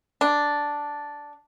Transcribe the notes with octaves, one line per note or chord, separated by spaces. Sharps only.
D4